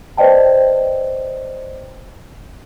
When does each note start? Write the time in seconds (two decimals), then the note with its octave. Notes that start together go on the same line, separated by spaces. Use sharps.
0.17 B4 C5 D5 D#5 G5 A5